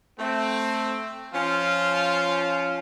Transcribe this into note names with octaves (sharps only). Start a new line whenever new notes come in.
A3 C4
F3 C#4 F4